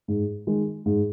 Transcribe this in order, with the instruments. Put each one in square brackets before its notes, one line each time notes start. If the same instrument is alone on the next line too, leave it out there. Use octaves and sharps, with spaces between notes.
[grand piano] G#2
D#3 G#3
G#2